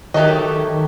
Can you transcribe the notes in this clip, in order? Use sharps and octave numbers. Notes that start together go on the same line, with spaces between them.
D#3 F#3 A3 D#4 G4 D#5